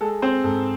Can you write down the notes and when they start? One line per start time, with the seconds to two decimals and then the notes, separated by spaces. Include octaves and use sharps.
0.01 G#3 A4
0.22 C4 C5
0.44 G#2 A4